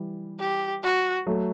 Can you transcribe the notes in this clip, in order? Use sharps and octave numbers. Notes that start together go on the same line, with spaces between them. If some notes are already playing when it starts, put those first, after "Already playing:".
Already playing: E3 G3
G4
F#4
F#3 A3